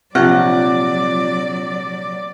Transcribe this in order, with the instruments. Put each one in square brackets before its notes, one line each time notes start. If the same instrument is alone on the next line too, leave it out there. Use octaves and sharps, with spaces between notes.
[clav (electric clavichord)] A#1 C3 [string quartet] F#3 D5 [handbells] C4 F4 [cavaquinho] F#5